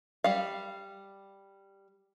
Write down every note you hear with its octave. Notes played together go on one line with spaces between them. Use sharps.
G3 F5